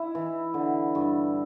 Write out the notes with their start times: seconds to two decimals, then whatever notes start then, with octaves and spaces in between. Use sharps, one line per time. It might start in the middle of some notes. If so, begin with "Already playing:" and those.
Already playing: E4
0.15 E3
0.54 D3
0.95 G2